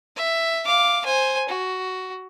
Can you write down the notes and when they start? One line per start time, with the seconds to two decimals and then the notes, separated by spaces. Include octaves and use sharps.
0.17 E5
0.66 F5 D6
1.05 C5 G#5
1.49 F#4